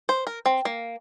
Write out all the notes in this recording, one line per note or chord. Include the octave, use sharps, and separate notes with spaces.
C5
A#4
C4
A#3